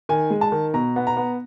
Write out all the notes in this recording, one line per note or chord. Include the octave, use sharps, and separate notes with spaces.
D#3 G#5
G#3
A5
D#3
B2 A#5
B3
A#5
B3